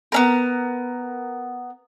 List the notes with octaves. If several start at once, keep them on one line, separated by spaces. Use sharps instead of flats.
B3 C#4 A#4